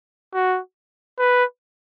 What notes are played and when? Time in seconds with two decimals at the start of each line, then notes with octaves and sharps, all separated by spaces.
0.34 F#4
1.19 B4